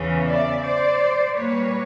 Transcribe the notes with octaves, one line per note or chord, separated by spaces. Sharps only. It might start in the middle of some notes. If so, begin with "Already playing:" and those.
Already playing: E2 C#3 E3
D5 E5
C5 D5
A#2 G3 A#3 B4 C#5